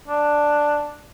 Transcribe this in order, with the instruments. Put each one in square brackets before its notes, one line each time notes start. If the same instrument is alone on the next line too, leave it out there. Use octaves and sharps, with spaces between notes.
[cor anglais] D4